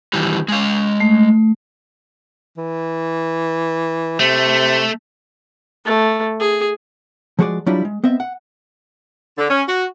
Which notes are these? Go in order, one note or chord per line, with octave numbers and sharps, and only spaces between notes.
D#3 E3 G3
G#3 F5
A3
E3
C3 A3
A3
G#4
F3 G#3 F#4 G#4 C5 D5
F#3 G3 D4 E4 F4
G#3
B3 C4 D#5 E5
F#5
D3
C#4
F#4